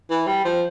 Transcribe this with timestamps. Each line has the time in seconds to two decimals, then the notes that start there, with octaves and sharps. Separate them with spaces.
0.10 E3
0.27 G3
0.45 F3